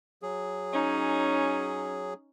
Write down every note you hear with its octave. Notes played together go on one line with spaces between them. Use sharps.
F#3 G#4
C#4 D#4